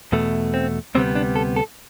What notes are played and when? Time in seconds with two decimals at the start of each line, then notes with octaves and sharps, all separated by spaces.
0.12 E2 B2 A3
0.54 C4
0.95 D2 C3 G3 B3 C4
1.15 D4
1.36 A4
1.56 A4